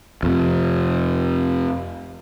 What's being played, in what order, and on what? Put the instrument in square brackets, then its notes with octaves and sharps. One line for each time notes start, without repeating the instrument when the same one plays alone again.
[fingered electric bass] F2 C3